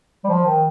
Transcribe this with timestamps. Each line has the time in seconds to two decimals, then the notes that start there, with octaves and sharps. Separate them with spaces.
0.24 G3
0.29 F3
0.46 D#3